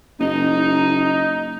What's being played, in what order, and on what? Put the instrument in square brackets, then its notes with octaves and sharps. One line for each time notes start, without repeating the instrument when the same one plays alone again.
[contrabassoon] F#1 [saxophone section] D#4